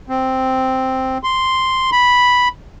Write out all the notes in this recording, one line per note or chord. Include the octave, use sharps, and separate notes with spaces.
C4
C6
B5